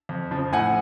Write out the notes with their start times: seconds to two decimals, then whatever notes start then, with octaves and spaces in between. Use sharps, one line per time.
0.09 F2
0.31 C#3 F3
0.53 A2 F#5 G#5